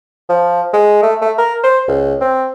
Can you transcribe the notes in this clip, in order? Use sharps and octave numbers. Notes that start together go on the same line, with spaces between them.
F3
G#3
A3
A3
A#4
C5
C#2
C4